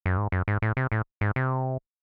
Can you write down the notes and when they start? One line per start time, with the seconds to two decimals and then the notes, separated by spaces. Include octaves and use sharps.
0.06 F#2
0.17 G#2
0.32 F#2
0.48 G#2
0.62 A2
0.77 C3
0.92 A2
1.21 G#2
1.36 C3